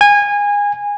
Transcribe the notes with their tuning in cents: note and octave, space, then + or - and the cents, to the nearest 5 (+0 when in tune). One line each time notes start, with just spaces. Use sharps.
G#5 -20